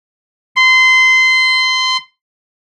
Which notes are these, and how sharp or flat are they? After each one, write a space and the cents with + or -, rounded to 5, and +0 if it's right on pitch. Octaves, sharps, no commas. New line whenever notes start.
C6 -25